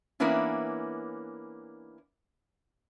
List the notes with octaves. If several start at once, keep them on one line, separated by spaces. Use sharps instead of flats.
E3 A#3 B3 C#4 D4 E4